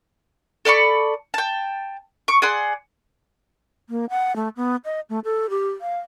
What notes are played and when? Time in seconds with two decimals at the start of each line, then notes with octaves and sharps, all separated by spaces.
0.65 A4 D5 B5 C#6
1.34 G5 A5
2.28 C#6 D6
2.42 G#4 D5 F#5 C6
3.88 A#3
4.10 F#5
4.36 A3
4.57 B3
4.85 D#5
5.10 A3
5.24 A4
5.50 G4
5.81 F5